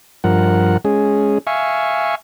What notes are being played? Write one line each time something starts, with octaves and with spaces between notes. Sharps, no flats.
G2 F3 A#4 F#5
G#3 C#4 G#4
E5 F5 G#5 C#6